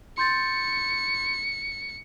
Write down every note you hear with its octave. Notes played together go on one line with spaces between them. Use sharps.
C6 G6 A6 C#7